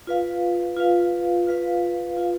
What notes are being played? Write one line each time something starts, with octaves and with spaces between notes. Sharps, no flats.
F4 B4 F5
F4 B4 F5
F4 B4 F5
F4 B4 F5